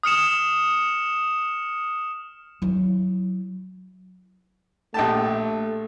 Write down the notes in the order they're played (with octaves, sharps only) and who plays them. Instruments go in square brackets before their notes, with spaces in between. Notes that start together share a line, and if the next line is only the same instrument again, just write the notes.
[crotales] D#6 F6 C#7 E7
[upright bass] F#3 E4
[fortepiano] A#1 G4 A5 [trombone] A3